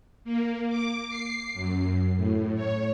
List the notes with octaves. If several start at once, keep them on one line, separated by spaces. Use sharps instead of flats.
A#3
D6
C7
F#2
A2
C#5